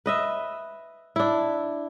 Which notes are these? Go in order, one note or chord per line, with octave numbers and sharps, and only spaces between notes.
B4 D#5 E5
D4 E4